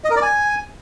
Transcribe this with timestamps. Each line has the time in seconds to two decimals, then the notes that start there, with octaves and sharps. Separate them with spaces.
0.04 D#5
0.10 A#4
0.16 D5
0.22 G#5